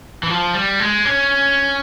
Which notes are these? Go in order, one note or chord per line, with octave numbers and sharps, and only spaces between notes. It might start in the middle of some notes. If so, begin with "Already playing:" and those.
E3
F3
G3
G#3
C#4